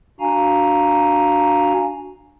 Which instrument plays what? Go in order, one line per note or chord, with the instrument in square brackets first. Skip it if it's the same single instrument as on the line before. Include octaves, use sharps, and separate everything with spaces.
[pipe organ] D4 F#4 F5 G#5 A#5